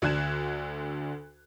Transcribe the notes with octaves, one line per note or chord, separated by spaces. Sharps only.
D2 D3 D4 F#6 G#6 E7